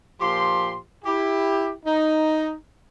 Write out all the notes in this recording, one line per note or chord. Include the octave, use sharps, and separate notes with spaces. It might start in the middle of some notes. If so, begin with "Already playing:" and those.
A#2 F3 G4 C6
E4 G4
D#4